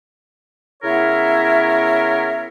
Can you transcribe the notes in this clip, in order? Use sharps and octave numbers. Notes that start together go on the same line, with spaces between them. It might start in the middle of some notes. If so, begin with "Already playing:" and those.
C#3 B3 E4 A#4 C#5 E5